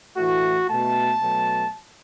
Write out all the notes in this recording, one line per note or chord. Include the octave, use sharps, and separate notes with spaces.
A2 E3 A3 F#4
B2 A3 A5
B2 F#3 A3